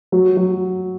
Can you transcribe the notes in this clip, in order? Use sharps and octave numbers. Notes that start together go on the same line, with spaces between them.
F#3
F#3